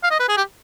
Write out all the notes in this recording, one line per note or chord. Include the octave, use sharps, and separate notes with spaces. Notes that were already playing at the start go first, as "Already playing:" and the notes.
F5
D#5
B4
G#4
G4